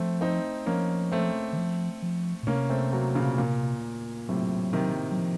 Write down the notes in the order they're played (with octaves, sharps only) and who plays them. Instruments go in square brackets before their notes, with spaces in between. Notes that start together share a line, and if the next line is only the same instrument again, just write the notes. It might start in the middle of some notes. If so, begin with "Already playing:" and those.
Already playing: [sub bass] F3 [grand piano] A3 C4
[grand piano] C4 D#4
[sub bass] F3 [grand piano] A#3 C#4
[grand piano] A3 C4
[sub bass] D#3
F3
F3
A#2
[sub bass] C3 [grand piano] A#3 C#4
[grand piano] A3 C4
F#3 A#3
A#2 C#3
A#2
[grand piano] A2 C3 [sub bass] F#3
[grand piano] C3 D#3
[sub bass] F#3
F3